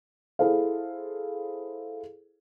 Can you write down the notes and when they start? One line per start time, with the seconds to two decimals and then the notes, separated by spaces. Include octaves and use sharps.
0.39 E4 G#4 A4 C5 F5